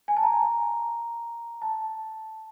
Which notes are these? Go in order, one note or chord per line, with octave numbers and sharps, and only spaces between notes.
G#5
A5
A#5
A5